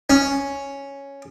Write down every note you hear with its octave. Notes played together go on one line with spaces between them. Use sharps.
C#4